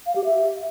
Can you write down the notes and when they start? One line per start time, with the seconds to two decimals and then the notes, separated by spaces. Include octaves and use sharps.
0.06 F5
0.16 G4
0.25 E5